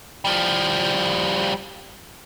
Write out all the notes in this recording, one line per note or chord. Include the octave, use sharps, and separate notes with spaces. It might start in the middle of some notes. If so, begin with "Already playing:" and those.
F3 G3